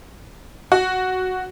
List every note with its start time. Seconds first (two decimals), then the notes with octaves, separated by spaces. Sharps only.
0.72 F#4